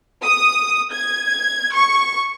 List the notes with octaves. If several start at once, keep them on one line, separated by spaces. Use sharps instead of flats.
D#6
G#6
C#6